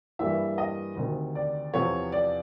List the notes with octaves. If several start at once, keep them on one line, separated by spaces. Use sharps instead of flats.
G2 E3 G3 A#3 E5
D#5
D2 C3 D#3
D5
E2 C3 F3 C#5
D5